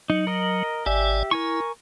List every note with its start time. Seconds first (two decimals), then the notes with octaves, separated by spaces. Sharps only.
0.10 F#3 D#4
0.27 A#4 D#5
0.86 G#1 G4 D5 E5 G#5
1.31 E4 A#4 G#5 C#6